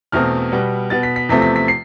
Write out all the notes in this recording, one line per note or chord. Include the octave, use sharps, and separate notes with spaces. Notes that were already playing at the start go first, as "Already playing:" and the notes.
E2 B2 A3 C4 F6
B2 G3 B3
B2 B3 A6
B6
B6
E2 C3 F3 A3 C4 B6
B6
B6
C7